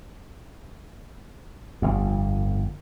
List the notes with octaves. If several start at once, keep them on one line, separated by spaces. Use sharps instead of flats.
G1 F2